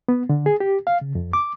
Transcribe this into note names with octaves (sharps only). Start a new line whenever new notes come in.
B3
D3
G#4
G4
F5
C#3
F2
D6